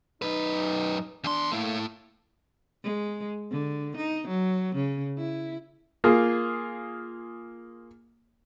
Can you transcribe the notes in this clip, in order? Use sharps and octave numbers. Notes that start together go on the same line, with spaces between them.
F#2 D#4 B4
E2 D4 C6
A3 A#3 E4
G#3
D3
D#4
F#3
C#3
E4
A#3 F4 G#4